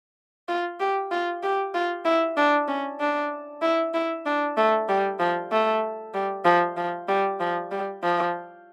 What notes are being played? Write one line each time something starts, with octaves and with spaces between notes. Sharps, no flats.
F4
G4
F4
G4
F4
E4
D4
C#4
D4
E4
E4
D4
A3
G3
F3
A3
G3
F3
F3
G3
F3
G3
F3